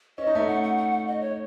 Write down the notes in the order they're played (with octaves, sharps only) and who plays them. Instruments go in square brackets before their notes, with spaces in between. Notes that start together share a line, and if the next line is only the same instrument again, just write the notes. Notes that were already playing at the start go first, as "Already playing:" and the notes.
[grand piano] C#4 [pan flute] D#5
[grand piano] D#4
[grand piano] A3 C#4 [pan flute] E5
[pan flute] F#5
F#5
F#5
F#5
D#5
C#5